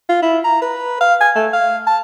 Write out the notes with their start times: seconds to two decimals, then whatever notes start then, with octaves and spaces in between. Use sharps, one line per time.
0.09 F4
0.22 E4
0.44 A#5
0.62 B4
1.01 F5
1.21 G#5
1.36 A3
1.53 F5
1.87 A5